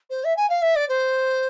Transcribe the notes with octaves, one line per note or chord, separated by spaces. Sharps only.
C5
E5
G#5
F5
E5
D5
C5